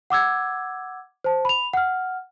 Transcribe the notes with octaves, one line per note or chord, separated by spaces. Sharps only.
F#5 D6 E6 G#6
C5 A5
B5 F7
F#5 F6